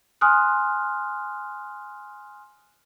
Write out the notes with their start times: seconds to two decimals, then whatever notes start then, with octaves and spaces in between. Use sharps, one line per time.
0.21 G#5 C6 D#6 F6 F#6